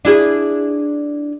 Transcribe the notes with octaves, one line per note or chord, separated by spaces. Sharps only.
D4 E4 G#4